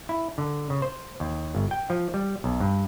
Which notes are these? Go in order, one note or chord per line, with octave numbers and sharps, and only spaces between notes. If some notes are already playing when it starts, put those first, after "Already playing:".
E4
D3
C#3
C5
D#2
G1
G5
F3
G3
B1
G2